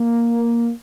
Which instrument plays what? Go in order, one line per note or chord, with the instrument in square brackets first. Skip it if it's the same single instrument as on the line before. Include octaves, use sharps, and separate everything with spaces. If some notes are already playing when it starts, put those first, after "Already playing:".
Already playing: [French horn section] A#3